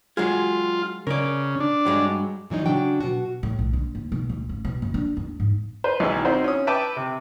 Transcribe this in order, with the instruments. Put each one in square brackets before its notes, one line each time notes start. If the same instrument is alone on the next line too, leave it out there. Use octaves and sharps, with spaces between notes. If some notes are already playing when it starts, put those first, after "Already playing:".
[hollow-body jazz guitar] F#3 G#3 G#4 [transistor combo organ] F4
[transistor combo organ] C#3 [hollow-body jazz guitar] A#4 D5
[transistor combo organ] D4
[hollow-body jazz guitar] G2 F#3 G#3
[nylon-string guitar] A#2 E3 F#3 D#4
C#3 F#3 D4 F#4 G5
B2 F#4
[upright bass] A2
B1
D3
D#2
B2
D2
A1
B2
F#1
D4
E2
G#2
[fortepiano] B4 C5
B1 D#3 E4 G#4 E6
C4 D#4 E4 F#4 C5
C#4 D#6
B4 E5 G5 A5 D6
C3